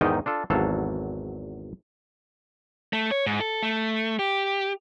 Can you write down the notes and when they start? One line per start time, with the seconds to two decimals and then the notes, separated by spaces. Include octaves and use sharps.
0.01 E2 G#2 D#3 D#4 D#5 G5
0.26 D4 F4 A4
0.50 G#1 E2 F#3 A4 F5
2.93 A3
3.11 C#5
3.26 G#2
3.40 A4
3.63 A3
4.19 G4